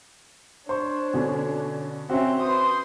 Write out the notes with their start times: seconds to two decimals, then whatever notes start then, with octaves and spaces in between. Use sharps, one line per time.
0.69 D4 C5 C#5 C#6
1.14 B2 D3 C#4
2.10 C4 C#4 F#4 E5
2.40 B4 C5 C6 D#6